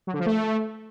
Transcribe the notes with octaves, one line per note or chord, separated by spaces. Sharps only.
F#3
D3
F3
A3